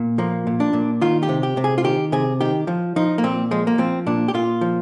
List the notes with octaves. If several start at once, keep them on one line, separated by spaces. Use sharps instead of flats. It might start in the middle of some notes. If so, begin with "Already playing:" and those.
Already playing: A#2
F3 A#3
A#2
D4
A#2
D#3 F4
G4
C3
G4
C3
G#4
F4
D#3 G4
C3 G#4
D#3 G4
F3
F3 D#4
A#3
A#2 C4
F3 G#3
A#3
F3 C4
A#2 D4
G4
A#2 F4
F3